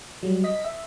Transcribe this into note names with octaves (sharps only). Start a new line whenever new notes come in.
F#3 G3
D#5 B6
E5